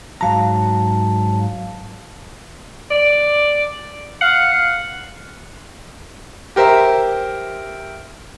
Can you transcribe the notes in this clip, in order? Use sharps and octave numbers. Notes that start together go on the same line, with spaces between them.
G#2 F#3 F5 A5 A#5
D5
F5 F#5
G4 A#4 C5 E5